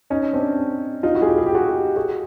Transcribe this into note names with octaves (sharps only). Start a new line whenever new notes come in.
C#4 D#4
C4 D4
D#4 F4
E4 F#4
G#4
F4 G4
G#4
G4
F#4 G#4
F#4 G#4